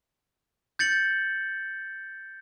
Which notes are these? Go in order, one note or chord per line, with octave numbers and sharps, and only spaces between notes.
G6 A6 C#7 F#7